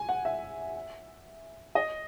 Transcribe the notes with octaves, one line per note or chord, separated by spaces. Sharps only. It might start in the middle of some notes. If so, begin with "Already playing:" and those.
Already playing: G#5
F#5
E5
D#5